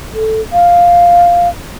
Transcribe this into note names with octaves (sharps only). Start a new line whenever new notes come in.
A4
F5